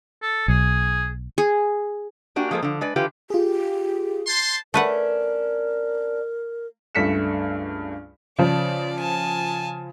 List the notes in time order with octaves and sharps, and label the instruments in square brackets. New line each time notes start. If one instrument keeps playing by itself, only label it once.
[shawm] A4
[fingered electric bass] B1 [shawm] G#4
[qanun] G#4
[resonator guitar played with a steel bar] A#3 D4 F#4 G4 G#5
F3 G#3 A#3 A4 C5
D3 F3
G#3 B4 D5
D3 E3 F4 G4 B4
[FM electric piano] F4 G#4 [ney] G4
[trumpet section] C5 A5 C6
[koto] A3 B4 F#5 [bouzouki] C#4 D4 [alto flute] A#4
[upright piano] C#2 G2 A3 B6 C#7 E7
[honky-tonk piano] C#3 F3 [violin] D5
[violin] G#5 A5